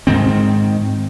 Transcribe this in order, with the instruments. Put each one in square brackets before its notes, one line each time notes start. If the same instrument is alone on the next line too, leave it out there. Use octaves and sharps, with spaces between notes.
[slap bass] G#2 D#3 C4